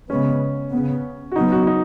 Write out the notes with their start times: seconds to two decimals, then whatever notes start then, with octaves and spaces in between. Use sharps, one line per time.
0.09 C#3 G#3 B3 C#4
0.72 C#3 B3
1.32 F#4
1.36 C#3 F#3 B3 D#4
1.52 F#4
1.63 F#4
1.67 D#4